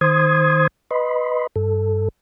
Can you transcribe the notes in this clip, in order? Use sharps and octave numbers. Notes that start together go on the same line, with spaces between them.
D#3 C5 C6 D#6 G#6
B4 D#5 B5 C6
G2 A4